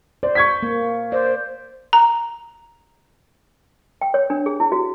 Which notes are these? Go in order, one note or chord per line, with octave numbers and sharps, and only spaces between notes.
C5 D5
C#6 G#6 B6
A#3
C5 D5
A#5
G5
C#5
D4
G#4
E4
F#4